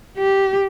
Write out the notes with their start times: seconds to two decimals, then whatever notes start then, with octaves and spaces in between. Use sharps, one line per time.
0.17 G4